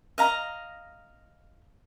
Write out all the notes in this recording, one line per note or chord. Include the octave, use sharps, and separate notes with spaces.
D#5 F5 A#5